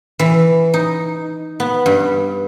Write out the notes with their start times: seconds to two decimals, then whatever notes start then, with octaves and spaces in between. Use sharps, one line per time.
0.19 E3
0.74 D#4
1.60 B3
1.86 G2